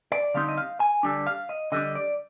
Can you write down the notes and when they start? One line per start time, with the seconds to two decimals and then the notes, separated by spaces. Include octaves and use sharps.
0.12 D5
0.34 D3 G3 C4 D#4 F5
0.49 D#5
0.58 F5
0.80 G#5
1.03 D3 G3 D4
1.27 F5
1.49 D#5
1.72 D3 G3 D4 D#5
1.95 D5